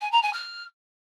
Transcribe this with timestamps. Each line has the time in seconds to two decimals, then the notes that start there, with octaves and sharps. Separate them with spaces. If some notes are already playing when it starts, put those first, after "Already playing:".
0.01 G#5
0.12 A#5
0.22 G#5
0.33 F6